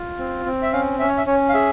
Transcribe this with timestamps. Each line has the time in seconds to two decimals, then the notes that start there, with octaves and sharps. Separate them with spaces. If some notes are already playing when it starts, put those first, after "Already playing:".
Already playing: F4
0.19 C4
0.46 C4
0.62 E5
0.73 C#4 F5
0.99 C#4 E5
1.09 C#5
1.17 E5
1.26 C#4 C#5
1.49 F5
1.53 G#4 E5